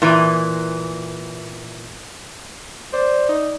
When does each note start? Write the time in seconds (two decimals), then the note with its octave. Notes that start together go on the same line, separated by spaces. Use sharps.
0.02 A#2 E3
2.93 C5 D5
3.29 D#4